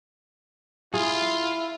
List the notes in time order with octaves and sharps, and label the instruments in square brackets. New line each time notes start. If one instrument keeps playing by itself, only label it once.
[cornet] E4 [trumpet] F4 [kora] G#4